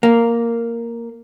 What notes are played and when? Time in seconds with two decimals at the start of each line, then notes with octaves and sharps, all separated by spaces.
0.03 A#3